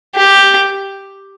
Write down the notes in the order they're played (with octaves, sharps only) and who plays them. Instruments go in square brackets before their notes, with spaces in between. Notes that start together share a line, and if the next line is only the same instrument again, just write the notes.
[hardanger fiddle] G4